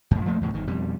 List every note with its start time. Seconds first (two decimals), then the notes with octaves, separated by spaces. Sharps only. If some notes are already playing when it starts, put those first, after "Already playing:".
0.11 F#2 A2
0.26 F3 A3 A#3
0.41 E2 A2 C3
0.54 G1 D#3
0.67 F2 B2 G3